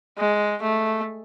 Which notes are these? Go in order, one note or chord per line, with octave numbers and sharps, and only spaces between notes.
G#3
A3